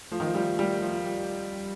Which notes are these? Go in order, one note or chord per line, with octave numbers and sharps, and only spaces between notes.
F3 A3
D#3
F3
G3
G3
F3
G3